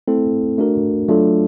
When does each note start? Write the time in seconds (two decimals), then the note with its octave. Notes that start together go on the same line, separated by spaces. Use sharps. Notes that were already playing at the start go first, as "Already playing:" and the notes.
0.08 A3 C4 E4 A4
0.58 A3 D4 F#4 A#4
1.08 F#3 A3 D4 F4 A4